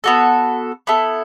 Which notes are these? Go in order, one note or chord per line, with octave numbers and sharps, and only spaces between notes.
B3 F#4 A4
B3 E4 A4